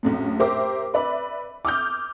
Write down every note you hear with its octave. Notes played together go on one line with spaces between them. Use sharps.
A#1 F#2 A2
G4 A#4 C5 E5 D6
B4 D5 E5 B5
D6 D#6 F6 G6